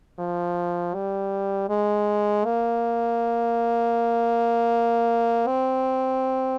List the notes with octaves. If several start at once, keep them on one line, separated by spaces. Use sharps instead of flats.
F3
G3
G#3
A#3
C4